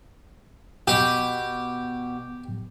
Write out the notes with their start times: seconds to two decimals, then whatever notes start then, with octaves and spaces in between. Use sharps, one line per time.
0.88 B2 G4